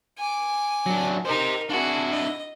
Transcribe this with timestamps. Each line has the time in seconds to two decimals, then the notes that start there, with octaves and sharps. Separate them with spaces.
0.18 G#5 D6
0.86 F#3 D4
1.25 D#4 G4 A#4 C5
1.69 D4 E4 F#4 G#4
2.11 D#5